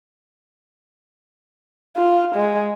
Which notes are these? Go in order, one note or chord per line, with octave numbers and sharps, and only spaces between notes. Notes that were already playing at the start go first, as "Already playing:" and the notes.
F4
G#3